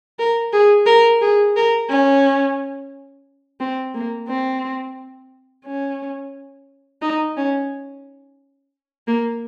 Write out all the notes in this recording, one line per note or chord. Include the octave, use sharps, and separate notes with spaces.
A#4
G#4
A#4
G#4
A#4
C#4
C4
A#3
C4
C#4
D#4
C#4
A#3